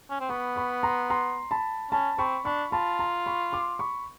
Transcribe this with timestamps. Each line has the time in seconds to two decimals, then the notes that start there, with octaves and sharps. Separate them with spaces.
0.10 C#4
0.20 C4
0.29 B3 B5 C#6
0.56 B5 C#6
0.83 A#5 C6
1.10 A#5 C6
1.51 A5 B5
1.91 C#4 A5 B5
2.18 C4 B5 C#6
2.45 D4 B5 C#6
2.72 F4 A5 B5
2.99 A#5 C6
3.26 B5 C#6
3.52 C6 D6
3.79 B5 C#6